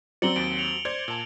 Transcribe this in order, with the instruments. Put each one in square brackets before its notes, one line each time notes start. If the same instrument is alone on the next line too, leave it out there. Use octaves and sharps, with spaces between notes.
[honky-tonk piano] F#3 C4 [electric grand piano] D5 A#5 [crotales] C#7 F#7 G7
[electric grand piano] D#2 A6 [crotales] D7
[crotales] C#7 F7
[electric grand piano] C5 D5 [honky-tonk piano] G#6
[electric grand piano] A#2 A5